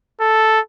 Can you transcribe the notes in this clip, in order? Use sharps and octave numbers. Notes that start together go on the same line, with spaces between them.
A4